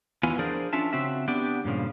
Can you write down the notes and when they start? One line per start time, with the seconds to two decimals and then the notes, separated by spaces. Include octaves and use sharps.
0.23 E2 E3 B3 F4 G#5
0.39 F3 D4 G#4 A#4 C5 D5
0.73 C#4 D4 F4 E5 A5
0.93 C#3 C4 F#4 E5
1.28 B3 D4 G4 D5
1.64 G2 A#2 C#3 F3